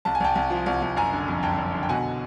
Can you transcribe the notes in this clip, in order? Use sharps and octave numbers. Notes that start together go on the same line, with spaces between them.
C2 A5
G#5
C2 G5 A5
C2
F3
C2
C2
F#1 G#5 A#5
D3
F2
F#1 G5 A5
F#1
D3
G5
B2 F#5 G#5